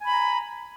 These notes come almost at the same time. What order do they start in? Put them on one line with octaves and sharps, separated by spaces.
G#5 B5 A#5